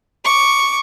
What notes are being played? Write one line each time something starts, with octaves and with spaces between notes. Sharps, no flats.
C#6 D6